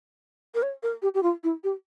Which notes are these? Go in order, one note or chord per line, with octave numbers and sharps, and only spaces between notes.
A#4
C#5
A#4
G4
G4
F4
E4
G4